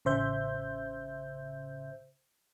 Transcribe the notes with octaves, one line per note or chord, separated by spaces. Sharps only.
A1 C#3 C5 E5 G6